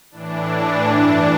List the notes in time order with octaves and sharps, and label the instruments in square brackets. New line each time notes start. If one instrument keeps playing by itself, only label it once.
[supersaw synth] A2 E3 D4
G2 E3